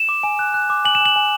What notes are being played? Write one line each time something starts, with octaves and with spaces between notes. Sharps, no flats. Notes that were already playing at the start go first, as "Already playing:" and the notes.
Already playing: E7
D6
G#5
F#6
F#6
D6
G#5 F#7
E7
G#5 F#7
G#5